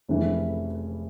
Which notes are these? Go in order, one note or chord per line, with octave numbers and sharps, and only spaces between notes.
F1 F2 C#3 E3